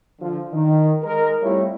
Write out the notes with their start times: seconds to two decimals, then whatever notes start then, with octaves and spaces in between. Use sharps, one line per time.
0.20 D3 F3
0.53 D#3
1.03 G#3 A#4
1.42 G3 A3 C4 E4 F4 C#5